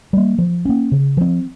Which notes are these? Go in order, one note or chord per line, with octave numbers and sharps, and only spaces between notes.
G3 A#3
F3
A#3 C#4
C#3
F3 C4